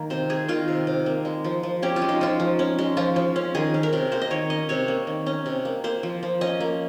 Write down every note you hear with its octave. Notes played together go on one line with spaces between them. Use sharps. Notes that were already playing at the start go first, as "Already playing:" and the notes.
Already playing: D#3 A#3
C3 C5
A#3 G#4
D#3 F4
C3
C3
A#3
G#3
F3
F3
C#4 G4
F4
G#3
D#4
F3 F4
F3
C#4
G#3
F3 F4
F3
C#4
D#3 G#4
C#4
A#4
C3
A#3 C5
D#5
D#3 C#5
C#4 D#5
C3 C#5
A#3
D#3
C#4 D#5
C3
A#3
A#3 C5
F3
F3
C#4 D#5
A#3